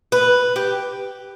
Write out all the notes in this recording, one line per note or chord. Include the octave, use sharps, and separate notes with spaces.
B4
G4